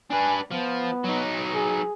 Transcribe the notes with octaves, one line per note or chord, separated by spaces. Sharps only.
D4 B4 G#5
F3 B3
F#3 D#4
G#4